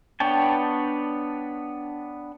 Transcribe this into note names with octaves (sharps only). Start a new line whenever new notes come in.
B3 D4 C#5 G5 A5